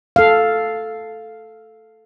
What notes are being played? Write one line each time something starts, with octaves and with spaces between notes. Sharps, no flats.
A4 F5